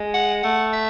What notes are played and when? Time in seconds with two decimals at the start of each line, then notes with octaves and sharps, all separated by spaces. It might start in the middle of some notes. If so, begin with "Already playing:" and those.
Already playing: G#3
0.14 F#5
0.43 A3 F#5
0.73 E5